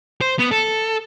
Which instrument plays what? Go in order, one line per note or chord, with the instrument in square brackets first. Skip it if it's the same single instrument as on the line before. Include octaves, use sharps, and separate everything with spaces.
[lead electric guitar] C5
B3
A4